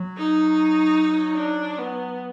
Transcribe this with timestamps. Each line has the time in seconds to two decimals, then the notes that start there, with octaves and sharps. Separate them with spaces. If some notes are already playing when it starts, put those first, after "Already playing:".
Already playing: F#3
0.17 D#4
1.34 D4
1.78 B3